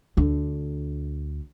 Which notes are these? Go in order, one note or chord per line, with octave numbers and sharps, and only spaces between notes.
D2 D3